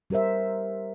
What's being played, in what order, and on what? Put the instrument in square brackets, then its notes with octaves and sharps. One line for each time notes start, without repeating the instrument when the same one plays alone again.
[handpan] G3 G4 A#4 C5 E5